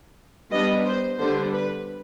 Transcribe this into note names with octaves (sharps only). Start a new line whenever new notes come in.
G3 B3 D4 D#5
C5
D3 G3 B3 D4 C5
B4